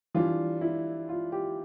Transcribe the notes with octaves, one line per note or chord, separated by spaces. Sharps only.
E3 G3 D4 F4
E4
F4
G4